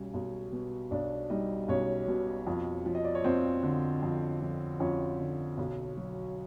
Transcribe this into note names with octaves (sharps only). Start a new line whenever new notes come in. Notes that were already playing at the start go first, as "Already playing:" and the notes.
Already playing: B1 G3 C#4 C#5
B1
B2
B1 D4 D5
G3 D#4 D#5
B1 C#4 C#5
B2
F2
F3
D#5
D5
C#5
F2 C4 C5
D3
F2
F3
F2 C#4 C#5
D3
B1
F#3